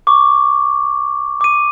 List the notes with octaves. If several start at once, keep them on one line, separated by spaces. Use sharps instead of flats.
C#6 D6
D6 D#7